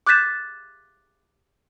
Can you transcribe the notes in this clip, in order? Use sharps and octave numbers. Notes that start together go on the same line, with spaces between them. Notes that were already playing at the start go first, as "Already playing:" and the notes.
D6 F#6 G6 A6 B6 E7